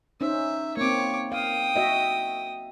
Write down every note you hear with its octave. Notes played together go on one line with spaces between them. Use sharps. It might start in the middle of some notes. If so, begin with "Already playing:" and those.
C#4 D#4 C5 E5
A#3 C4 C#5 D6
F5 G5 D#6
F#4 D#5 E5